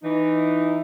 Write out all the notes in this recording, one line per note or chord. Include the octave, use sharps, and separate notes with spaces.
E3 D#4